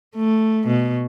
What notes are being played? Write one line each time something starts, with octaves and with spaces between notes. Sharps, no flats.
A3
B2